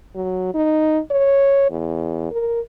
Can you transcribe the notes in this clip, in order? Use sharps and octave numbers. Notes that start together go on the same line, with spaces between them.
F#3
D#4
C#5
E2
A#4